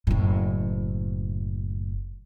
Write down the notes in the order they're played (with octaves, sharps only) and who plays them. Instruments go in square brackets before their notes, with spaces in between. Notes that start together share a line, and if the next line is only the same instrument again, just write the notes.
[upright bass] F#1 A2